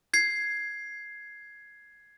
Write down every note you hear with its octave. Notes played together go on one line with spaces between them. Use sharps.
G#6 C7